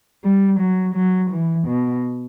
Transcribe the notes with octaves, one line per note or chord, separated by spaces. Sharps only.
G3
F#3
F#3
E3
B2